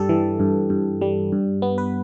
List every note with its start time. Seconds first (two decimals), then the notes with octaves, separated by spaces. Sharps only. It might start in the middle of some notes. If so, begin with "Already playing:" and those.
Already playing: G2 G3 G4 A4
0.09 E3
0.40 G2
0.70 G2
1.01 G3
1.32 G2
1.62 B3
1.78 B4